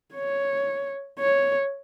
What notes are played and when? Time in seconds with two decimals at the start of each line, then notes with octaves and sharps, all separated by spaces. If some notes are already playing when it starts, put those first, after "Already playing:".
0.15 C#5
1.19 C#5